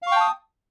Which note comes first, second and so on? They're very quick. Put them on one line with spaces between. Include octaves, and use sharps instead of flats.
F5 C#6 G5 A5 D#6